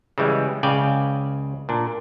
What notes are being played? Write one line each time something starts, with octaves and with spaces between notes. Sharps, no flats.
C#3 E3 G3 G#3
C#2 C#3 D5 F5 G5 G#5
A#2 D4